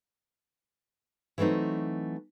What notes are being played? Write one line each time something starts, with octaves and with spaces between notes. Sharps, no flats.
E3 F#3 A3 C4 D#4